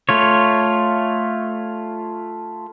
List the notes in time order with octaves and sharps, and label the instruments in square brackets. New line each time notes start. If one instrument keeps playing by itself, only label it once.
[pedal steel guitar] A3 F4 C#5